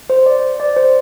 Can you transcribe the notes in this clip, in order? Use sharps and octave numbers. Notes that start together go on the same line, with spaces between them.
C5
D5
D5
C5